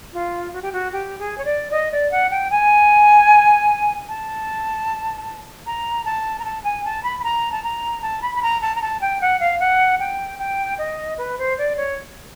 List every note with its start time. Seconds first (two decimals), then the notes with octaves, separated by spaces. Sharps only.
0.13 F4
0.53 F#4
0.62 G4
0.72 F#4
0.92 G4
1.19 G#4
1.38 C#5
1.45 D5
1.71 D#5
1.92 D5
2.11 F#5
2.30 G5
2.51 G#5
4.09 A5
5.66 A#5
6.05 A5
6.39 A#5
6.44 A5
6.64 G#5
6.85 A5
7.03 B5
7.19 B5
7.24 A#5
7.52 A5
7.64 A#5
8.02 A5
8.22 B5
8.35 B5
8.42 A#5
8.62 A5
8.75 A#5
8.82 A5
9.01 G5
9.21 F#5
9.40 F5
9.60 F#5
10.00 G5
10.39 G5
10.78 D#5
11.18 B4
11.38 C5
11.58 D5
11.77 C#5